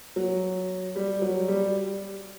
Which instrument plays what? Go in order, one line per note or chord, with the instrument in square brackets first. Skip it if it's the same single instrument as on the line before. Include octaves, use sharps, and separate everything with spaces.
[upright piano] F#3
G3
F#3
G3